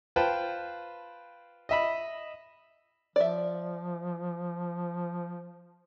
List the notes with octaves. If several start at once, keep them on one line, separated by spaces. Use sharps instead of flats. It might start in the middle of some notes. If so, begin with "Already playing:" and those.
F4 B4 C5 G5 A5
D#5 E5 B5
F3 D5 E5